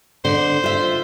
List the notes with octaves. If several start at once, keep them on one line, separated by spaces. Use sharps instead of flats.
D3 C5
F4 E5